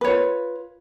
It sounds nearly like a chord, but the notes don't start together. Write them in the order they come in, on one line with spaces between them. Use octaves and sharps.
B4 C#5 F4